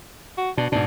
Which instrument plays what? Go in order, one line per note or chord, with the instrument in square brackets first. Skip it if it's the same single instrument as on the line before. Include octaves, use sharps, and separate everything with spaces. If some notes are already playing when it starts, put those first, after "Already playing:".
[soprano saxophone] F#4
[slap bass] B2 [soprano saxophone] D4
[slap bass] G#2 B2 [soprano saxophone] D4